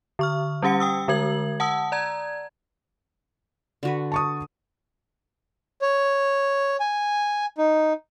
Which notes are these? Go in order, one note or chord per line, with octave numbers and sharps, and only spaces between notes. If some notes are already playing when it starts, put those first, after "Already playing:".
D3 C#6 F6
G3 C#4 G4 F#5 C#7
G5 D#6 E6
D3 G#3 A#4 G#6 F#7
F#5 A5 D#6 E6
D5 A#5 G#6
D3 F#4 B4
A5 C#6 D#6
C#5
G#5
D#4